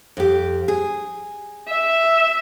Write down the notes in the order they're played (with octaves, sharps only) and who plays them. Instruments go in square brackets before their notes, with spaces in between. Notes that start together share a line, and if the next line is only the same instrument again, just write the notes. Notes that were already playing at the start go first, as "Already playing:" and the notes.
[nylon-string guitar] F2 G4
G#4
[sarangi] E5